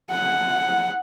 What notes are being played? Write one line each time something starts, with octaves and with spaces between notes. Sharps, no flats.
F#5